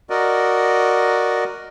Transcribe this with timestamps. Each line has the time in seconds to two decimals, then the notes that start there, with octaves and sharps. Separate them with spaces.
0.10 F#4 A#4 D5 D#5